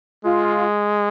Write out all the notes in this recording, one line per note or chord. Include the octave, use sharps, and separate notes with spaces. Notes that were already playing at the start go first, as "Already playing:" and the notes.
G#3 F4